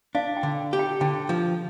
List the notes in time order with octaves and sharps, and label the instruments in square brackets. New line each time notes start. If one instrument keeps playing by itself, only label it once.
[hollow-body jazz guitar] D4 [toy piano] F5
[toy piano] G5
[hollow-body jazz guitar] D3
G4
[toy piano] G5
[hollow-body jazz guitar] D3 [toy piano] G5
[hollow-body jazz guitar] F3